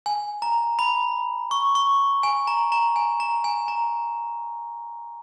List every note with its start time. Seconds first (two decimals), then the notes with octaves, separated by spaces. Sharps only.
0.06 G#5
0.42 A#5
0.79 B5
1.51 C#6
1.75 C#6
2.23 G#5
2.47 A#5
2.72 A#5
2.96 G#5
3.20 A#5
3.44 G#5
3.68 A#5